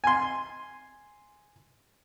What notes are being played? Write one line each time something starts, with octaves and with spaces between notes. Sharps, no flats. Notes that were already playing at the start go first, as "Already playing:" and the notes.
G#5 C6